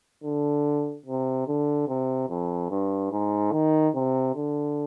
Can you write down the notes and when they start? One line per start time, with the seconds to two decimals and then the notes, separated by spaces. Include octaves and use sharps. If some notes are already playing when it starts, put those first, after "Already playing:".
0.24 D3
1.06 C3
1.47 D3
1.88 C3
2.29 F2
2.70 G2
3.12 G#2
3.52 D#3
3.94 C3
4.35 D3